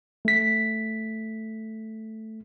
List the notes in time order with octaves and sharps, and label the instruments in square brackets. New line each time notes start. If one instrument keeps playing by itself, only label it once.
[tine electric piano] A3 B6